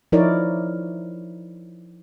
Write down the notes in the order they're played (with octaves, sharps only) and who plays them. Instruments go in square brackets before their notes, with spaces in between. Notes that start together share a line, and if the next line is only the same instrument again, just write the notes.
[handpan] F3 D#4 E4 A#4 C#5 D5